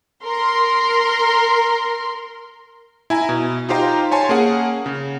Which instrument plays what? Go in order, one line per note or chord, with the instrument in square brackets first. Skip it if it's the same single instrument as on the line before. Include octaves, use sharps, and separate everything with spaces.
[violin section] A#4 C6
[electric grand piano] E4 G#5 A#5
B2
D#4 F4 G4 C5 F5 A#5
C#5 G#5 A5 C6
A#3 C#4 G#4 F#5
C#3